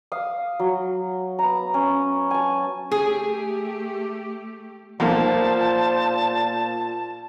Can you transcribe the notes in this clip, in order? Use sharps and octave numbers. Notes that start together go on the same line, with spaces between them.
F5 D#6
F#3
B3 A#5
C#4
G#5 A5
A3 G4 G#4
B1 A#2 F3 A#3 C5 A5